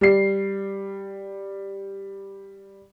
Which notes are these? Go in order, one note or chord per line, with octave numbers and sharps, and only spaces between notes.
G3 C7